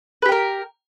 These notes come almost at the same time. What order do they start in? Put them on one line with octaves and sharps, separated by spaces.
B4 G4 G5 A#4